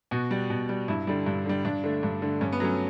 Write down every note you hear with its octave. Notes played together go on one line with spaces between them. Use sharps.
B2 F#4
G3
B2
G3
G2 E4
D3 G3
G2
D3 G3
G2 D4
D3 A3
G2
D3 A3
G2 C#4
B3
F#3 A3 C#4